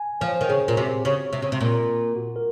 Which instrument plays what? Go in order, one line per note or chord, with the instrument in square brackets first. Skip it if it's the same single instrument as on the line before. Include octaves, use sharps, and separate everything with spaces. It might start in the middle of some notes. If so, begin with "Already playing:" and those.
Already playing: [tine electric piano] G#5
[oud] F3 [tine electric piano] C5
[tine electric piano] C#5
C5
[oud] D#3
[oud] C#3 [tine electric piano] G#4
[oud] A#2
[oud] C3 [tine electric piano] F#4
[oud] C#3
C3
C#3
C3
A#2
[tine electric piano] F#4
A#4